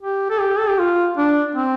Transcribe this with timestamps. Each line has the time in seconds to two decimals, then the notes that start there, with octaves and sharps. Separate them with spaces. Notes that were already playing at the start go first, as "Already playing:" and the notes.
0.01 G4
0.30 A4
0.40 G4
0.58 A4
0.69 G4
0.79 F4
1.17 D4
1.55 C4